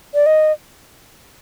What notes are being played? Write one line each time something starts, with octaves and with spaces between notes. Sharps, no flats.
D5
D#5